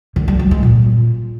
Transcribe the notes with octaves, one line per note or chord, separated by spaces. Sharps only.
D3
G3
F#3
G#3
A#2